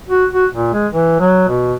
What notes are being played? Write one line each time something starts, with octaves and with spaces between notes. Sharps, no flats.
F#4
F#4
A#2
G#3
E3
F#3
B2